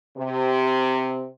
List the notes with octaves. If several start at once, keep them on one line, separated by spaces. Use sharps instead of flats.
C3